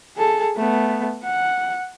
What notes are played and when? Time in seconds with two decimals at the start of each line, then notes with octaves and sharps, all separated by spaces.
0.17 G#4 A4
0.57 A3 B3
1.24 F#5